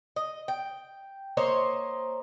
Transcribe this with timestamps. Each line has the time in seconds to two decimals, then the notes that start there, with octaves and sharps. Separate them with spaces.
0.16 D#5
0.48 G5
1.37 A#3 C5 C#5 D#5